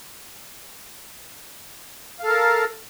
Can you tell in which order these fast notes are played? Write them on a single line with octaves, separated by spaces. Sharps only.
F5 A4 A#4